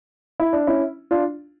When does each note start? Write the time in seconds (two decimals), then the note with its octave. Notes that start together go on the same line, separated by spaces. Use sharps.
0.40 E4
0.53 D4
0.67 C#4 E4
1.11 D4 F4